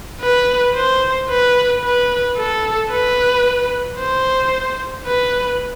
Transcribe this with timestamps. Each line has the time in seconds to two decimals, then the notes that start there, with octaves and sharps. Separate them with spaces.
0.21 B4
0.75 C5
1.29 B4
1.83 B4
2.37 A4
2.91 B4
3.98 C5
5.07 B4